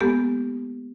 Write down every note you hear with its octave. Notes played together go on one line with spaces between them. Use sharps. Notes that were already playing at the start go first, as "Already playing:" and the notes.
G#3 A#3 B3 G4 A4